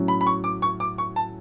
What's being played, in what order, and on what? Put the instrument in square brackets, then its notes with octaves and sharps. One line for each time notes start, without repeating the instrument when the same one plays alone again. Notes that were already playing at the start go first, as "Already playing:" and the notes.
Already playing: [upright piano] A2 F#3 C#4
[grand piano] B5
B5
C#6
D6
C#6
D6
C#6
A5